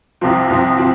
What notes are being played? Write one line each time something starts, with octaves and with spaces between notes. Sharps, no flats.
C2 C3 F3 C4
C2 C3 F3 C4
C3 F3 C4